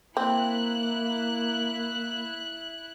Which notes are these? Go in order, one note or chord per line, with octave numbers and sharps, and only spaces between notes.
A#3 C4 E4 F#6